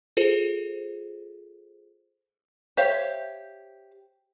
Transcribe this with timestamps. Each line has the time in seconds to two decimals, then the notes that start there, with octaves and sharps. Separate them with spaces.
0.17 F4 G#4 A4 C5
2.77 G4 C5 C#5 E5 F5